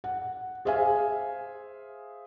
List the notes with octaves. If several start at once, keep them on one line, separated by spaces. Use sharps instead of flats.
F#5
G#4 C5 E5 F5 G#5